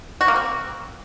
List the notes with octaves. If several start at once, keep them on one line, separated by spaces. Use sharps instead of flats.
F#4
A#3
C4